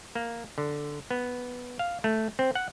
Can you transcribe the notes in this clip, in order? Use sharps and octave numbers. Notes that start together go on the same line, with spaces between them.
A#3
D3
B3
F5
A3
C4
F#5